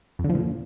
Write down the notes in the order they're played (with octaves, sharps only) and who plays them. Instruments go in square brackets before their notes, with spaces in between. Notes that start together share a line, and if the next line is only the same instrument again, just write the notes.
[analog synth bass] F2
D3
F3
A#2